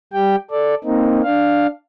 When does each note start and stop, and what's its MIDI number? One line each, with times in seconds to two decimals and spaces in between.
0.13 0.36 55
0.13 0.36 67
0.13 0.36 79
0.51 0.75 69
0.51 0.75 74
0.84 1.21 58
0.84 1.21 60
0.84 1.21 63
1.23 1.67 62
1.23 1.67 77